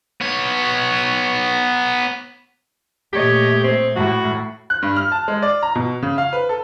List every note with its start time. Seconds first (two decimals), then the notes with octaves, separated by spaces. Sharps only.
0.21 B3 C#5
3.13 A#2 A3 G4 C#5 D#5
3.64 C4
3.96 A2 F#4
4.70 F#6
4.82 G2
4.97 F6
5.12 A5
5.28 G#3
5.42 D5
5.63 A#5
5.75 B2
6.03 C#3
6.18 F5
6.33 B4
6.49 A4